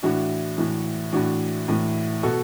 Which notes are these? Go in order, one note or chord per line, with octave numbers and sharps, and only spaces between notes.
A2 E3 D4 F#4
A2 E3
A2 E3 D4 F#4
A2 E3
B2 F#4 A4